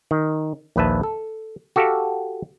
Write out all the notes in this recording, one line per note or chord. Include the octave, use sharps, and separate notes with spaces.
D#3
A#1 D#2 B4 E5 A5
A4
F#4 G4 A4 F5